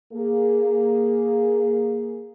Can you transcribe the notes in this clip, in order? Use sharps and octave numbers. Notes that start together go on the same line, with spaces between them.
A#3 G#4